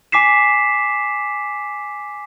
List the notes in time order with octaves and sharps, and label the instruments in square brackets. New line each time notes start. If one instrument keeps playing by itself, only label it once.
[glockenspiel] G#5 D6 B6 C7 E7